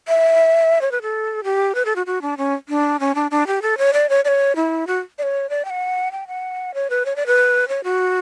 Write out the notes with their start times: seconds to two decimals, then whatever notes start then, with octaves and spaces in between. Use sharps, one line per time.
0.08 E5
0.81 C#5
0.92 B4
1.02 A4
1.44 G4
1.75 B4
1.85 A4
1.96 F#4
2.06 F#4
2.22 D4
2.37 C#4
2.69 D4
3.00 C#4
3.15 D4
3.31 D4
3.47 G4
3.62 A4
3.78 C#5
3.93 D5
4.09 C#5
4.25 D5
4.28 C#5
4.56 E4
4.87 F#4
5.19 D5
5.23 C#5
5.50 D5
5.65 G5
5.70 F#5
6.12 G5
6.28 F#5
6.74 C#5
6.90 B4
7.06 C#5
7.16 D5
7.26 B4
7.68 C#5
7.84 F#4